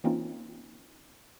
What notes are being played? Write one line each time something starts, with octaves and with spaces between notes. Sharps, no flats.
E3 A#3 C4 C#4 D#4 F4